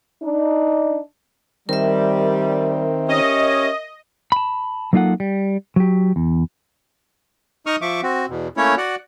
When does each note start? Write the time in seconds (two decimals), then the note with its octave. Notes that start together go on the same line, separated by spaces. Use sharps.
0.23 D4 D#4
1.69 D#3 G3 C4 A#4 E5
3.08 C#4 G4 C#5 D#5
4.32 A5 B5
4.93 F#3 A#3 D#4 F4 A4 F#5
5.20 G3
5.76 F#3 G4
6.16 E2
7.66 D#4 D#5 C#6 D#6 F6
7.82 F3 E5 C#6 D6
8.03 C4 F#4
8.29 E2 B2
8.57 A3 A#3 C#4 E4 C#5
8.77 F#4 D5 F#5